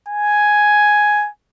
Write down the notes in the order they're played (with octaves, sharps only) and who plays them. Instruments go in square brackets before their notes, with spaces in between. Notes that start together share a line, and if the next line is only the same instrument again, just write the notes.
[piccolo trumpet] G#5